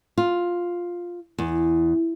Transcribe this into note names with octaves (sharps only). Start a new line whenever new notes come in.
F4
E2